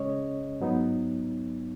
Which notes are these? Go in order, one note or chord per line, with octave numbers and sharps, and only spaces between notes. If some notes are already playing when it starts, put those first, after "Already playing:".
Already playing: C#3 G#3 C#4 C#5 D#5
G#2 F#3 B3 D#4